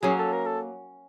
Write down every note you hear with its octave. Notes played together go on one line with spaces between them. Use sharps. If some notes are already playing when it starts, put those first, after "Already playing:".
F#3 A#3 C#4 G#4
A4
A#4
A4